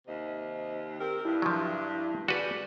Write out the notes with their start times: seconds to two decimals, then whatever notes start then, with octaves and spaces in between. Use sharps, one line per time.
0.07 D#2 C3 D#5
1.00 C4 G4 A#4
1.25 G2 D4 E4
1.42 F3 F#3
2.28 G3 F#4 G#4 B4 D5 G6